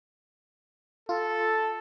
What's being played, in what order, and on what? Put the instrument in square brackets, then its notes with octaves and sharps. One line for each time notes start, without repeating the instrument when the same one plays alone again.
[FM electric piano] F4 [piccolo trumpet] A4